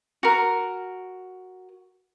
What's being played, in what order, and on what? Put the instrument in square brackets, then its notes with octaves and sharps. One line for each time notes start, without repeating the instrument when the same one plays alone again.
[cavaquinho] F#4 A#4